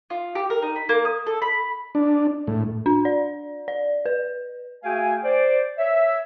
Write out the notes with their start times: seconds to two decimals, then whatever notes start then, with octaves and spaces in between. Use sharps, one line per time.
0.10 F4
0.35 G4
0.50 A#4
0.62 D#4
0.76 B5
0.89 A#3
1.05 D#6
1.27 A4
1.42 B5
1.95 D4
2.47 A2
2.86 D4
3.05 D5
3.68 D5
4.06 B4
4.84 A3 F#4 G#4 F5 G5 G#5
5.24 C5 D5
5.78 C#5 E5